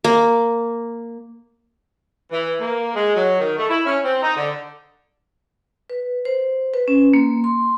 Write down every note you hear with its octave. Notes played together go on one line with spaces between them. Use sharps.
A#3
E3
A#3
G#3
F#3
D#3
A3
E4
C#4
C4
D#4
D3
B4
C5
B4
C#4
A#3
C6